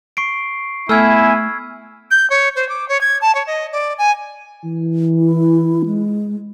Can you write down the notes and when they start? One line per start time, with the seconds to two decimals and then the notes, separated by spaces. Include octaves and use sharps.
0.17 C#6 C7 D7
0.89 A3 B3 E4 G#5 E6 F6 G#6
2.11 G6
2.30 C#5
2.56 C5
2.69 D6
2.89 C#5
3.01 G#6
3.21 A5
3.35 C#5
3.47 D#5
3.72 D5
3.98 G#5
4.64 E3
5.18 E4
5.86 G#3